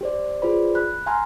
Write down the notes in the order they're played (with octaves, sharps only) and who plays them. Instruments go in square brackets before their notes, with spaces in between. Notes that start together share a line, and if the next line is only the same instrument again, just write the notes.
[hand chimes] G4 C5 D5
F4 G#4 B4 C5 D5 B5
B5 F#6
F5 G#5 A#5 C6 F6